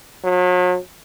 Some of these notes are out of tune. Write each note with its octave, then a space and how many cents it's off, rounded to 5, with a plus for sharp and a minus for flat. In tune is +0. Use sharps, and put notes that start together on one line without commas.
F#3 -40